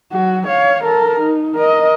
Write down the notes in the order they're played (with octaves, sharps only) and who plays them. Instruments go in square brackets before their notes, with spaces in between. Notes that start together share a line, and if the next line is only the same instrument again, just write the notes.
[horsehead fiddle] F#3 F#4
C#5 F5
A4 A#4
D#4
A#4 D#5